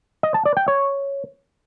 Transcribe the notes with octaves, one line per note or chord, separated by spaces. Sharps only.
D#5
A5
D5
G5
C#5